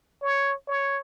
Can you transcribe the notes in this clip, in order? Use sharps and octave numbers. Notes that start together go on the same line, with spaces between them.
C#5
C#5